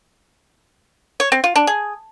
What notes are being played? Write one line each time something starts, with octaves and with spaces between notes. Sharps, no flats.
C#5
C4
F4
D4
G#4